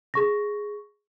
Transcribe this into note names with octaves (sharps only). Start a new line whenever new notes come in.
G#4 C#6 A#6